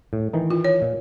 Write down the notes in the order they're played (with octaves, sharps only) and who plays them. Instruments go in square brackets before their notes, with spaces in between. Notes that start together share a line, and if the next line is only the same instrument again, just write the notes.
[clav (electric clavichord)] A2
D#3 E3 D#4
[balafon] F4
C#5
[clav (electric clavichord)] A#2